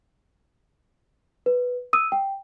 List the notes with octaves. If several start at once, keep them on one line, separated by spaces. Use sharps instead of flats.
B4
D#6 E6 D#7
G5